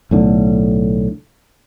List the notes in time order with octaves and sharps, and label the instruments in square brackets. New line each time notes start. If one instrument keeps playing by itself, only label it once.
[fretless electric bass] B1 A2 D3